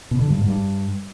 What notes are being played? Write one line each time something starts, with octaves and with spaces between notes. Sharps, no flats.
B2
D3
G2
G#2
G2